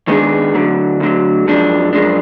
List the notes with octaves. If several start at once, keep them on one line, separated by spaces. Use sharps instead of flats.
D#3 G#3 B3 D4 G#4
D2 D3 F#3
D2 D3 F#3
F#2 F3 G#3 D4
F#2 F3 G#3 D4